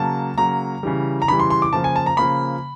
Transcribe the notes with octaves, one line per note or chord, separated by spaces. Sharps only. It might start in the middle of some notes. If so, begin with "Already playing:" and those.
Already playing: C#3 F#3 A#3 A5
C#3 F#3 A#3 A#5
C#3 E3 G3
A#5
C#3 E3 G3 B5
C6
C6
D6
C#3 F3 A#3 A5
G#5
A5
A#5
C#3 F3 A#3 B5